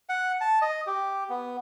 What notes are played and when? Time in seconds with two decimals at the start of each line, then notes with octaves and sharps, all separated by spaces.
0.09 F#5
0.41 A5
0.62 D#5
0.87 G4
1.29 B3